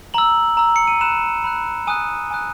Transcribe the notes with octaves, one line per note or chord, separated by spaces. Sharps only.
A#5 E6 F#7
A#5 E6
C#7
D#7
B5 F#6 E7
B5 F#6
G#5 D#6 F#6 D#7
G#5 D#6 F#6